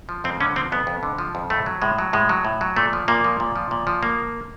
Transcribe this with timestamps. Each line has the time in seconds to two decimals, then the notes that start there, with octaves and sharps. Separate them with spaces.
0.09 F3
0.24 F2 C4
0.40 D3 C#4
0.56 F3 C4
0.72 F2 B3
0.87 F2
1.03 D3
1.18 F3
1.35 F2
1.50 A2 A3
1.66 F#3
1.82 A2 G#3
1.99 F#3
2.13 A2 G#3
2.29 F#3
2.45 A2
2.61 F#3
2.76 A#2 A3
2.93 F3
3.08 A#2 A#3
3.24 F3
3.40 A#2
3.56 F3
3.71 A#2
3.87 F3
4.03 A#3